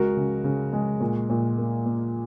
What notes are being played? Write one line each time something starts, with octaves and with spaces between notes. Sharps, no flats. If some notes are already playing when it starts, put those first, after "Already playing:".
Already playing: C#2 G#3 F#4 A#4
C#3
C#3
G#3
A#2
A#2
A#3
A#3